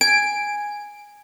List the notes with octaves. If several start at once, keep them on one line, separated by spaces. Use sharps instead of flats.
G#5 D7